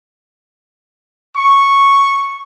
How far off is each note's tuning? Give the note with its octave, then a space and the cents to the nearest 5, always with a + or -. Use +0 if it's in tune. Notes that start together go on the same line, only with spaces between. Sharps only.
C#6 -5